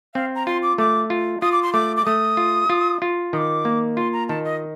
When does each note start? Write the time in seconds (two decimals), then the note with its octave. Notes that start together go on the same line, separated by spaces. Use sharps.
0.15 C4 F5
0.35 A#5
0.47 F4 C6
0.62 D6
0.78 A3 D6
1.10 F4
1.42 F4 D#6
1.52 D6
1.63 C6
1.73 A3 D6
1.97 D6
2.06 A3 D#6
2.37 F4
2.69 F4
3.02 F4
3.33 D#3 D#6
3.37 D6
3.65 A#3
3.97 F4 C6
4.13 A#5
4.28 D#3 A5
4.45 D#5